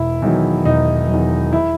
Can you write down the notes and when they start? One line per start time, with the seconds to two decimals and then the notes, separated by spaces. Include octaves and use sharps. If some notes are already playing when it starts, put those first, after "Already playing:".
Already playing: E1 E4
0.22 E2 D#3 F#3
0.65 E1 D#4
1.09 E2 D#3 F#3
1.53 E4